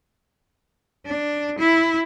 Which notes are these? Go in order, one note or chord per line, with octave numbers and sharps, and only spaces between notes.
D4
E4